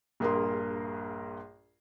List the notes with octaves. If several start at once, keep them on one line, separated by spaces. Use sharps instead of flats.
A#1 G2 A#3 G#4 A#4 C6